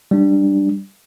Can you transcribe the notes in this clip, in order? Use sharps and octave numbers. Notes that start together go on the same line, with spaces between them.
G3 D4